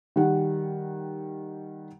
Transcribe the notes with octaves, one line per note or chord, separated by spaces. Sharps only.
D#3 G3 F#5